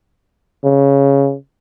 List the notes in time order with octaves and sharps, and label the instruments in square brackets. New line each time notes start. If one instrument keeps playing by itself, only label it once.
[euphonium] C#3